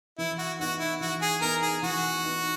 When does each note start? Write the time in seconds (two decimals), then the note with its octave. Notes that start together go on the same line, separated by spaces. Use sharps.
0.18 E3 E4
0.38 F#4
0.60 B3 D#4 F#4
0.79 E4
1.00 E3 F#4
1.22 G#4
1.41 B3 D#4 A#4
1.62 G#4
1.83 E3 F#4
2.24 B3 D#4